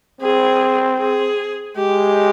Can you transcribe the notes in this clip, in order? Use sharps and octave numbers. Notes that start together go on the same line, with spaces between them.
C4 G#4
G#4
G#3 G4